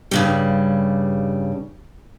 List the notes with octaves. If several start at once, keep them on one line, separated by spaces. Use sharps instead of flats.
G2 C#3 G3